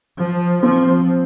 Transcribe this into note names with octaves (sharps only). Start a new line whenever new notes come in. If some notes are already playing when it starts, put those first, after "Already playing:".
F3
F3 C4